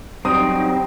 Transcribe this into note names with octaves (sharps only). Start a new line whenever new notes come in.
F#3 G3 C4 D#4 D#6